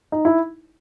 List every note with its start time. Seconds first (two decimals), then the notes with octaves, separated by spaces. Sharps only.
0.12 D#4
0.25 E4